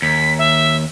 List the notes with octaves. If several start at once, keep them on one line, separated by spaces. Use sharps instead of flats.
D#2 B6
E5